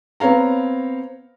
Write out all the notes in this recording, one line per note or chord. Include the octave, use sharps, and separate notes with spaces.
B3 C4 C#5 F5 A#5